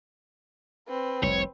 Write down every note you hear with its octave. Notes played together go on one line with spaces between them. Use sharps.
C4 B4
F1 C2 C#5